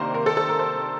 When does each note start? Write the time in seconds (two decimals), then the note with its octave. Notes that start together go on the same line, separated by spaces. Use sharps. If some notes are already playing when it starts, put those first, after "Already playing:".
Already playing: C3 D#3 A#3 D4 A#4 C5
0.14 A#4
0.26 A4
0.37 A4
0.49 A#4
0.59 C5